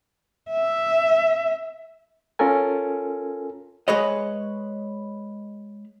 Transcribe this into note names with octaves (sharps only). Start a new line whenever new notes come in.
E5
C#4 F4 A4 A#4 G#5
G#3 G#4 B4 C#5 D#5